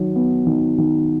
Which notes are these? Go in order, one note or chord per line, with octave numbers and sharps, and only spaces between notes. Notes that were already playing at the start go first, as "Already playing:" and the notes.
Already playing: D#3 F#3
B3
D#3
D#3